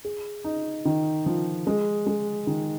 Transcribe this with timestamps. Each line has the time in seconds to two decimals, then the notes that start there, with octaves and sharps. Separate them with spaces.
0.05 G#4
0.44 D#4
0.85 D#3
1.26 F3
1.67 G#3
2.07 G#3
2.47 D#3